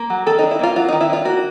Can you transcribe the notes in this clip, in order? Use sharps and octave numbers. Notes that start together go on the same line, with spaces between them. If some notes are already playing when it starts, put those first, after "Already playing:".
Already playing: A#3
F#3
D#3 A4
D#4
D4
E4
A#3 F4
F#3 F4
D#4
D#3
E4
D4 F4
A#3 F#4